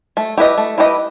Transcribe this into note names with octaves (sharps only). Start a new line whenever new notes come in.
A3
E4 G4 B4 D#5
A3
E4 G4 B4 D#5